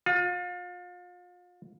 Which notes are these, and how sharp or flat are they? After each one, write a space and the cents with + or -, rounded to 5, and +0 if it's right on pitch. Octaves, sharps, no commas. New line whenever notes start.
F4 +35